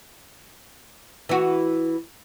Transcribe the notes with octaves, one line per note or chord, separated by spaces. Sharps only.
E3 F#4